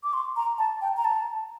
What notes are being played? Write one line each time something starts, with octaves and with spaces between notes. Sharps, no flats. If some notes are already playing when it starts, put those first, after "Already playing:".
D6
C6
A#5
A5
G5
A#5
A5